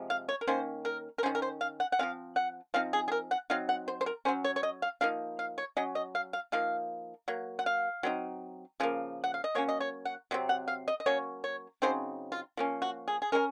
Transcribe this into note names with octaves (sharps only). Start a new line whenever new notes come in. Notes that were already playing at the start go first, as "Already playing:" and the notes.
Already playing: C3 F3 G#3
F5
C#5
A#4
D#3 A#3 C#4 C5
A#4
A#4
D#3 A#3 C#4 C5
A#4
C5
F5
F#5
F#5
F3 G#3 C4 F5
F#5
F3 C4 D#4 F5
G#4
G#4
A#4
F#5
F#3 C4 D#4 F5
F#5
C5
C5
A#4
F#3 C#4 C5
C#5
C#5
D#5
F5
F3 A#3 D#4 F5
F5
C#5
F#3 C#4 D#5
D#5
F5
F5
F3 A#3 D#4 F5
F#3 A#3
F#5
F5
F#3 C4 D#4
C#3 F3 A#3
F#5
F5
D#5
F#3 A#3 C#4 C#5
D#5
C#5
F#5
C3 F#3 C4
F#5
F5
D#5
D#5
F#3 A#3 C#4 C#5
C#5
C#3 F#3 C4 D#4 C5
F4
F3 A#3 C#4
F#4
G#4
G#4
G#3 C#4 A#4